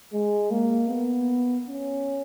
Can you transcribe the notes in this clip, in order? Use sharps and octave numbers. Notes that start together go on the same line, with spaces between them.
G#3
A#3
B3
C#4